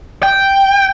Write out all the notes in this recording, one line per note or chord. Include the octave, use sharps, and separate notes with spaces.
G5